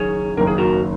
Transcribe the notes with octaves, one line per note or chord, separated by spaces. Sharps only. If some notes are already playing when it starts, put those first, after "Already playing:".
Already playing: F#1 F#2 D#3 G#4 C#5
F#1 F#2 D#3 A#3 A#4
G#4
F#4 A#4